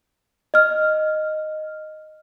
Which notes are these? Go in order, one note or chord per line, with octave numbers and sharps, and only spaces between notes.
D#5 F6